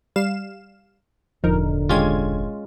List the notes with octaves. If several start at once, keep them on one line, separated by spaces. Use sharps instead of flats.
G3 F5 E7
E1 A1 D3 F3 D#4 A#4
G#1 G#3 C#4 F4 G4 G#6